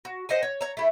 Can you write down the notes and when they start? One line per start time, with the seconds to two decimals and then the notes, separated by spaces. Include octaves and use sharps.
0.05 F#4
0.29 C5 D#5 F#5 G#5
0.43 C#5
0.61 C#5 A#5
0.77 A3 E4